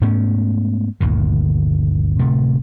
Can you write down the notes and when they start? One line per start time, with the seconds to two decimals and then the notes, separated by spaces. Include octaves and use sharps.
0.01 G#2 A3 B3 C#4
1.00 G1 D2 A#2 D#3
2.19 D1 C3 A3